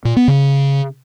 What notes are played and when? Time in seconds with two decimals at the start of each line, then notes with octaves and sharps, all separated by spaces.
0.05 A#2
0.16 B3
0.28 C#3